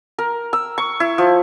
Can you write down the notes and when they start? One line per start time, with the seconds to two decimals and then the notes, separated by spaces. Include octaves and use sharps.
0.19 A#4
0.53 E6
0.78 C#6
1.00 E4
1.18 F3